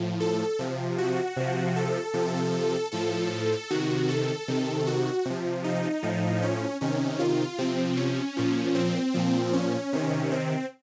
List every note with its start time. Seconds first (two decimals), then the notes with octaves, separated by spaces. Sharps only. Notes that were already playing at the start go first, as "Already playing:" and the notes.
Already playing: A2 F3
0.20 A4
0.59 C3 F3
0.98 F#4
1.37 C3 F3
1.76 A4
2.14 C3 F3
2.92 A2 F3 A4
3.71 C3 D#3 F#4
4.09 A4
4.48 C3 D#3
4.87 F#4
5.25 C3 F3
5.64 D#4
6.03 A2 F3
6.42 C#4
6.81 C3 D#3 C#4
7.19 F4
7.58 C3 F3 C4
7.97 C#4
8.37 A#2 F3
8.75 C4
9.14 A#2 F3
9.53 C#4
9.93 C3 D#3
10.32 C4